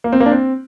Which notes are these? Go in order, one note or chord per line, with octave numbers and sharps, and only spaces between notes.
A#3
C4
A#3
D4
C4